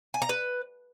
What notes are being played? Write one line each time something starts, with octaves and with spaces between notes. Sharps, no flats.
G#5
A#5
B4